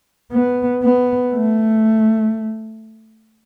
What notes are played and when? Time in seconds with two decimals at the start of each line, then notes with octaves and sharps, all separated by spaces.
0.32 B3
0.83 B3
1.34 A3